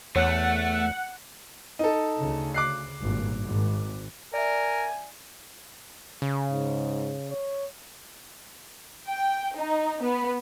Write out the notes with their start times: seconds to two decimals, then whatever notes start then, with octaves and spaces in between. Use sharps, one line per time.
0.16 E2 A3 C#5 F#5
1.79 D#4 A4
2.18 D2 C#3
2.54 D6 F#6 C7
3.01 G#1 G2 A#2
3.44 G#1
4.33 A#4 D5 E5 G#5
6.22 C#3
6.51 G#2
7.30 C#5
9.08 G5
9.56 D#4
10.02 B3